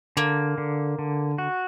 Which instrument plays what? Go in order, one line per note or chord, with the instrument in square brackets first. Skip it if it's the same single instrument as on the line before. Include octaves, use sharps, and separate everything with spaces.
[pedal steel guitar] D3 [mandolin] A#3
[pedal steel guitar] D3
D3
F#4